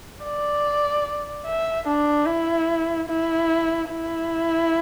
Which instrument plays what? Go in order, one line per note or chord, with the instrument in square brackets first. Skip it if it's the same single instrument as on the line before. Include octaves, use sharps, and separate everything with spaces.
[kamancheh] D5
E5
D4
E4
E4
E4